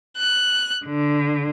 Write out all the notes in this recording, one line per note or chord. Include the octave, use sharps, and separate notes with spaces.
F#6
D3